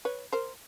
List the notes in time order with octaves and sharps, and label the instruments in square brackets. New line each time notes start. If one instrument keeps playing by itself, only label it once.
[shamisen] B4 C#5
A#4 C5